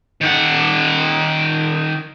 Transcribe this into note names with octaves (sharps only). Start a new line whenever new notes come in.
D#3 F#5